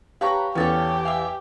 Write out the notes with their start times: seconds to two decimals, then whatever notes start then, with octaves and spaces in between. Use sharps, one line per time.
0.21 G4 B4 C#5 F5 A5 A#5 C#6
0.55 E2 C#4 G4 A4 C#5
1.05 E5 F5 G#5